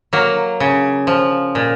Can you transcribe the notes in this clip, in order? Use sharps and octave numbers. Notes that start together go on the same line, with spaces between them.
F#3 A#3
C#3
F3
A#2